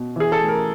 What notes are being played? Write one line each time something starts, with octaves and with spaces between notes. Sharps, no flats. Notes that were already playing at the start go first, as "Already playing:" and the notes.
Already playing: B2
E3 G#4
A4
A3
A#4